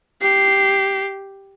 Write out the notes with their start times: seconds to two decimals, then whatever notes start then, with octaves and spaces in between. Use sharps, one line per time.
0.22 G4 C7